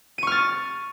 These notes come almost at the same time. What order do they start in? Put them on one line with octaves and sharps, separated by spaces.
D#7 C#6 F6 A6